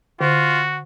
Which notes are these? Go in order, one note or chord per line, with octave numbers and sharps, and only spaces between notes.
D3 F4 F#4